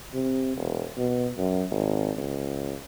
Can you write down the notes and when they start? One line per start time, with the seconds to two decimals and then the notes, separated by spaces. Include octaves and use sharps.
0.14 C3
0.57 E1
0.97 B2
1.38 F#2
1.71 G#1
2.17 C#2